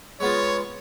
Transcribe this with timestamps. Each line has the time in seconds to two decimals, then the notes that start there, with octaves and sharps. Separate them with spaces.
0.20 G#3 B3 F4 C#5